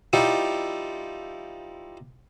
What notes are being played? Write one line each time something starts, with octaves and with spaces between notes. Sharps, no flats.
F3 G3 D#4 E4 G4